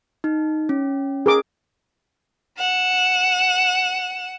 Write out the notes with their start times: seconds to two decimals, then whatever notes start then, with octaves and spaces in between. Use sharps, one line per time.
0.24 D#4
0.69 C#4
1.26 G#4 A#4 D6
2.59 F#5 E7